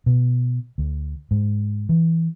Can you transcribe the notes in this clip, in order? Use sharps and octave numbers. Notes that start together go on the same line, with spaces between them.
B2
D2
G#2
E3